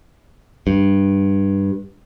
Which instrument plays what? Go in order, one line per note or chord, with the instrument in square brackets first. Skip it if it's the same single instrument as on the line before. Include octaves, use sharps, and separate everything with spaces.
[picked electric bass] G2